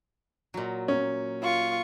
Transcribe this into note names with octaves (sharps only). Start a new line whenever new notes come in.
A#2 F#3
C#4
F4 C#6